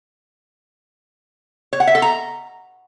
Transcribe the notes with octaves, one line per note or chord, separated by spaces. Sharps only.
C#5
F#5
E5
A4
A#5